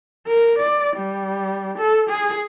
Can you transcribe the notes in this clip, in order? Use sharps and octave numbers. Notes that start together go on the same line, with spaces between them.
A#4
D5
G3
A4
G#4